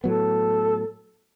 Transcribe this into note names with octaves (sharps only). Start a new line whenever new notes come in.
A2 F#3 B3 A4